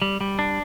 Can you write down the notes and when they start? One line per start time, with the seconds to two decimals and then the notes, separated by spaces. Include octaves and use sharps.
0.02 G3
0.21 G3
0.39 D4